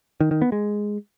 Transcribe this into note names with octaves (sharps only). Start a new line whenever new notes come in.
D#3
D#3
B3
G#3